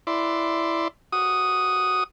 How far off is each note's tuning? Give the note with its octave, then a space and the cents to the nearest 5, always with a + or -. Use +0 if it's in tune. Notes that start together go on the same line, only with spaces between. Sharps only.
E4 +5 D5 +0 C6 -5
F#4 +0 D#6 +0